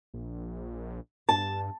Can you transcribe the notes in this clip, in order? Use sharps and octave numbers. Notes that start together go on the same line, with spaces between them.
A#1
G2 A5